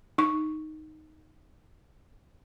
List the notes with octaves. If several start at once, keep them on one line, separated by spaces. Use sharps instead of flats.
D#4 C#6